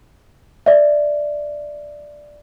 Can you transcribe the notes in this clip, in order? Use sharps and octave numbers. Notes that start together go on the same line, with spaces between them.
D5 E5